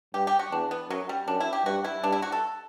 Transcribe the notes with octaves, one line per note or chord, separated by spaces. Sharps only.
G2 G4
G4
F#4
E2 D4
B3
F#2 F#3
G3
F#2 D4
E4
G4
G2 F#4
E4
G2 D4
E4
F#4
A4